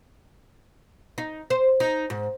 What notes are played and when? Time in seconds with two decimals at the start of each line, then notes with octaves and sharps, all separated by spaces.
1.18 D#4
1.50 C5
1.80 D#4
2.10 G#2